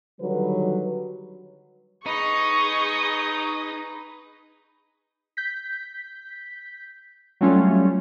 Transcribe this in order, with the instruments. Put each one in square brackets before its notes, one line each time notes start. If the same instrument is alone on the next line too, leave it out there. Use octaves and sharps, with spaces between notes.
[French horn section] D3 D#3 F#3 G3 B4 C#5
[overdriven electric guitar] D#4 [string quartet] G#4 D#5 D#6 [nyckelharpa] B4 [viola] C#6
[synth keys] G6 B6
F#3 G3 A3 C#4 F4